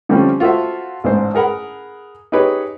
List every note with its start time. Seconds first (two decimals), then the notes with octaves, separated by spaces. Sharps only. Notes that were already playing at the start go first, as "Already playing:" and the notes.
0.09 D3 F3 G3 A3 C4 C#4
0.40 F4 F#4 A4 C5 E5
1.04 A1 G#2 D4 C5
1.35 G#4 A#4 F#5 B5
2.32 D#4 G4 G#4 B4 C#5